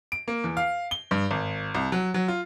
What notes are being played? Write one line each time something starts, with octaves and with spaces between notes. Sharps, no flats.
D7
A#3
E2
F5
G7
G2
G#1
C2
F#3
F#3
F4